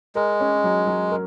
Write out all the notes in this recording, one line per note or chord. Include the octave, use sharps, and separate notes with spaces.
G#3 A#4
C#4
F#3
F#3
A#4